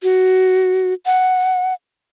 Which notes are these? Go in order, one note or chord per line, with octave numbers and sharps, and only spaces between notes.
F#4
F#5